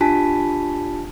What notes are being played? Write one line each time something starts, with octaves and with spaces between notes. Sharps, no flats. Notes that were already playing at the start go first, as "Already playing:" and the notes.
D4 F4 G4 G#5 A5 B6